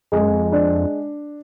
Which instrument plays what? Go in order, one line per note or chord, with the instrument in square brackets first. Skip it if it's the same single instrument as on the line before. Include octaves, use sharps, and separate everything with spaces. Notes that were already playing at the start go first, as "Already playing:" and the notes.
[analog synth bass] F2 [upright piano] G#3
[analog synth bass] F#2
F2
[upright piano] D4